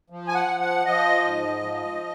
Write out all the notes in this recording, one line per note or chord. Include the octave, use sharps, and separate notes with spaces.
F3
G#5
F#5
F3
F#5
F3 D#5
G#2
F3